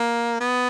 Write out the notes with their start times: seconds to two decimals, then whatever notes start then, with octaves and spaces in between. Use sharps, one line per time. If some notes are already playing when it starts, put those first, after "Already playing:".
Already playing: A#3
0.41 B3